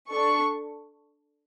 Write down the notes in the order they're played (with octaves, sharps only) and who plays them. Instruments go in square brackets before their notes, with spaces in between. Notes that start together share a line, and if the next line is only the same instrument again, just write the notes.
[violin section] D4 A4 C#6